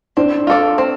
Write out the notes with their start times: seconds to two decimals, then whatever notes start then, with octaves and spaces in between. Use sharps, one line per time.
0.17 C4 D4
0.47 F4 A4 D5
0.78 C4